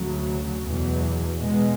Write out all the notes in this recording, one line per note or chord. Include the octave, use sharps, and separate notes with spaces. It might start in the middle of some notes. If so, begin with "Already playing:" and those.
Already playing: D2 C#3 F#3
E2 B2 F#3
B2 G#3 B3